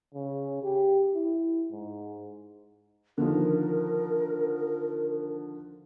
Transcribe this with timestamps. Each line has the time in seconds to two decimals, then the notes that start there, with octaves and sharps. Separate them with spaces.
0.14 C#3
0.63 G4
1.14 E4
1.71 G#2
3.18 D3 D#3 F3 A#4